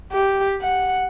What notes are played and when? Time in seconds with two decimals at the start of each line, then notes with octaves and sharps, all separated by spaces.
0.12 G4
0.61 F#5